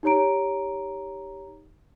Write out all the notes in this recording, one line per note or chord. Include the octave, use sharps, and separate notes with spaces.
D#4 G4 C#5 A#5 D7